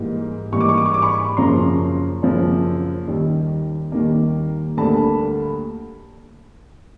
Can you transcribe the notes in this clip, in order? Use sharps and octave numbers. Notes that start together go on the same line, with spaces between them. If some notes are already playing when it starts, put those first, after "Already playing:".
Already playing: G#2 E3 G3 A#3
G#2 E3 G3 A#3 C#6
D6
C#6
D6
C#6
D6
B5 C#6
F#2 C#3 F3 A#3 A#5 C6
F#2 C#3 F3 A#3
D#2 D#3 G3 A#3
D#2 D#3 G3 A#3
D2 D3 G3 A#3 A5 B5